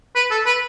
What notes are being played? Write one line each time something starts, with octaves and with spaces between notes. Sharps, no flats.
B4
A4
B4